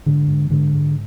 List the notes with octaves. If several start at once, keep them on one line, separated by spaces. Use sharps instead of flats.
G#2 D3
G#2
G#2 D3
G#2